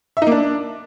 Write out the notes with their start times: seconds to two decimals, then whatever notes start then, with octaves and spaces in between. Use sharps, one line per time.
0.17 E5
0.22 D#4
0.27 A#3
0.32 D4